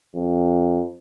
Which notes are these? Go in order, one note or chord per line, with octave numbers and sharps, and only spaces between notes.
F2